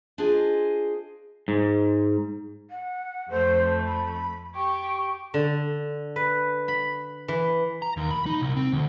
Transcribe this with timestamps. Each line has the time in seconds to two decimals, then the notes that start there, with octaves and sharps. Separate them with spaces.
0.18 D4 F4 G#4 C5 D#5 G#5
1.48 G#2
2.70 F#5
3.30 F2 A3 C5
3.86 B5
4.55 G4 C#6
5.34 D3
6.16 B4
6.68 B5
7.28 E3
7.82 A#5
7.97 D#2
8.11 B5
8.26 D#4
8.42 C2
8.56 C4
8.73 D2